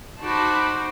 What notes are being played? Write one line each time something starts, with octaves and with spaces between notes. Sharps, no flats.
D#4 F#4 C5 A5 B5 D6